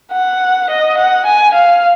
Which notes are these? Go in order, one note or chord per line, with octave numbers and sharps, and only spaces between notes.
F#5
D#5
F#5
G#5
F5